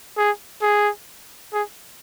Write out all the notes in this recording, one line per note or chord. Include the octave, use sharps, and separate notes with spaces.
G#4
G#4
G#4